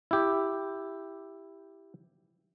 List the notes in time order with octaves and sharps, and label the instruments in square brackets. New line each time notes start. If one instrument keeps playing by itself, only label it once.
[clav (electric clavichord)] E4 G4